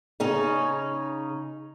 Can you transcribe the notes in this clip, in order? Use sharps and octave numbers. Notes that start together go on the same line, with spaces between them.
C#3 C#4 D#4